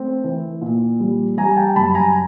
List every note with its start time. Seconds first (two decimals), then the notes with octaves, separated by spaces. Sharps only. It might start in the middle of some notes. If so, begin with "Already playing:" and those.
Already playing: A3 C4
0.24 E3
0.61 A#2
1.00 G3
1.37 G3 G#5 A#5
1.51 A#5
1.56 G5 A5
1.76 F#2 A5 B5
1.95 G#5 A#5